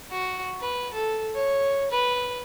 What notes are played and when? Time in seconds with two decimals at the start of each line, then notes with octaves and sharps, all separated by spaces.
0.11 F#4
0.61 B4
0.94 A4
1.35 C#5
1.91 B4